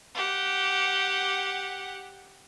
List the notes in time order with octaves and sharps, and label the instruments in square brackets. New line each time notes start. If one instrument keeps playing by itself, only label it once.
[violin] G4 F#5